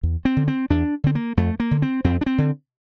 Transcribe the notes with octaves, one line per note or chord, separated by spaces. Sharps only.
E2
C4
D3
C4
E2 D4
D3 C4
A#3
F2 A3
A#3
D3
C4
F2 C4
D4
C4
D3